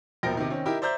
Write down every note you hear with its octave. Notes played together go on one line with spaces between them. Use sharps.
E1 A#1 F3 A#4 G5 A#6
C3 D#3
D#3 C4 C#4
D#4 E4 G4 A#4
C5 D5 E5 A#5 G6